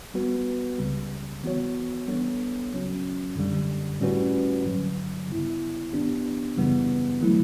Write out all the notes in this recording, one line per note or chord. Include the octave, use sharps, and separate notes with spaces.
G3 B3 F#4 B4
C#2 C#3 G3
E3 B3 F#4 C#5
G3 B3 D4 A4 C#5
C#2 C#3 F#3 C#4 F#4
F#2 D3 G3
A2 G3 C#4 F#4 B4
G2 D3 F#3
C#3 G3 B3 E4
A2 E3 B3 D4 G4
F#2 C#3 E3 G3 B3
D3 F#3 A3 E4